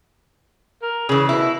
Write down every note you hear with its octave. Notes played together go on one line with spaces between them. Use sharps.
A#4
C#3 E3 G#4
B2 E4